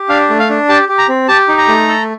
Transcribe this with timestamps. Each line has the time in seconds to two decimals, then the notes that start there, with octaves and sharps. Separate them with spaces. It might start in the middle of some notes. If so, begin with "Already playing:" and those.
Already playing: G4
0.09 D4 F5
0.30 A3
0.39 F5
0.49 D4
0.69 G4 A5
0.89 G4
0.98 A#5
1.09 C4
1.28 G4 A5
1.48 D#4
1.58 A#5
1.68 A3
1.88 A4